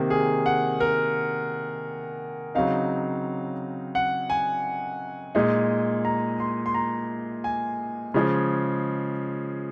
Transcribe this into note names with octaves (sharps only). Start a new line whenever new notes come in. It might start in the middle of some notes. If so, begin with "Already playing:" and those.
Already playing: C3 D#3 A#3
G#4
F#5
A#4
C#3 F#3 C4 D#4 F5
F#5
G#5
A#2 G#3 D#4
A#5
C6
C6
A#5
G#5
C#3 F3 G#3